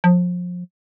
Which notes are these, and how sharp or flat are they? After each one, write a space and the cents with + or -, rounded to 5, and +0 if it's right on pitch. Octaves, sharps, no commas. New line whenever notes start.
F3 +30